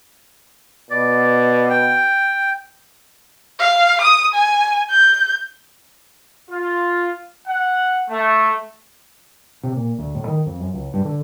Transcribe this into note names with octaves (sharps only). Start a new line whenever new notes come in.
B2 D5
G5
F5
D#6
G#5
G6
F4
F#5
A3
C3
A#2
D2
A2
D#3
F2
F#2
C#2
G2
D3